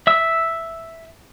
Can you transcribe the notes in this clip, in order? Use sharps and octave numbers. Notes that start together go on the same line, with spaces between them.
E5 E6